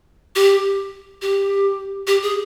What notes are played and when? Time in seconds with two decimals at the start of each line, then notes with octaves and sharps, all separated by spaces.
0.35 G4
1.22 G4
2.07 G4
2.22 G#4